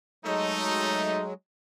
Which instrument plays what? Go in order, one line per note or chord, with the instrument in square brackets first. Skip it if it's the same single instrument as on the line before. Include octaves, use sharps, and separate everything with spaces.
[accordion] F#3 G#3 [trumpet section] A3 D#4